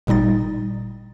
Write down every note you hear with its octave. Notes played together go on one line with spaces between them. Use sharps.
G#1 A#2 G3 D#4 A6